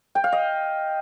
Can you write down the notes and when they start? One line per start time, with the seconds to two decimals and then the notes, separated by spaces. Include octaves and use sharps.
0.15 G5
0.24 F5
0.32 D#5